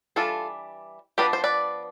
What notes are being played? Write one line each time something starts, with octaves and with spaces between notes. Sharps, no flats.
E3 G3 D4 F4 A4
F3 B3 D4 G4 B4
C5
B4 D5